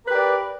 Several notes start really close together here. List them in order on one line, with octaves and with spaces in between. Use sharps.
A#4 B4 G4 D5